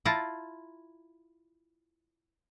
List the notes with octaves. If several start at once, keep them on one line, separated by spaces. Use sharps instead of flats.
E4 F4 A5 A#5